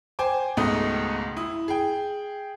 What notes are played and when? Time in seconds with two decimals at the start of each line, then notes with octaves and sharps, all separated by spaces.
0.19 C5 G5 G#5 D6
0.57 C#2 G#2 B2 A3 D#5 D#6
1.37 E4 D#6
1.68 G#4 G5